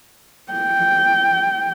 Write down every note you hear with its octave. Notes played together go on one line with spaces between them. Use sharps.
G5